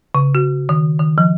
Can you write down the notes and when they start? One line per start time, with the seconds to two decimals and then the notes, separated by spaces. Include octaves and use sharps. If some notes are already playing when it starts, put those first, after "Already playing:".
0.15 C#3
0.35 F#4
0.69 D#3
0.99 D#3
1.18 F3